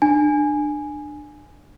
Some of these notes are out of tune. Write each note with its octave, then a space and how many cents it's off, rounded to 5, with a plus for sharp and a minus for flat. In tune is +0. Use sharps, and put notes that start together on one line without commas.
D4 +25 G#5 +0